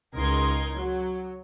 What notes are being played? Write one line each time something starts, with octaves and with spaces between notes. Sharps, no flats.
C#2 D#4 A#4 C6 G#6
F#3